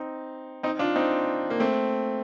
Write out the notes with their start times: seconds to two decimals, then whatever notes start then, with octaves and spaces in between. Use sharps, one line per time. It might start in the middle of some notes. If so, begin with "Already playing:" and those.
Already playing: C4 D#4
0.63 C4 D#4
0.79 D4 F4
0.96 C4 D#4
1.50 A#3
1.60 A3 C4